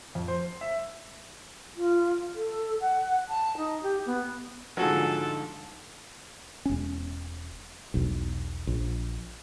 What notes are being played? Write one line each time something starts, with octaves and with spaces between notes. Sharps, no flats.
F2
C5
E5
F4
A4
F#5
A5
D#4
G4
B3
G#2 D3 F3 F#3 F#4 G#4 A4
E1 C#4
E1 B1
A#1